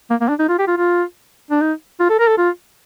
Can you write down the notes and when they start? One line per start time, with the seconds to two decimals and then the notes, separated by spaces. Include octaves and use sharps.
0.10 A#3
0.21 A#3
0.29 D4
0.39 D#4
0.49 F4
0.59 G4
0.67 F4
0.78 F4
1.51 D4
1.62 D#4
2.00 F4
2.10 A4
2.19 A#4
2.28 A4
2.38 F4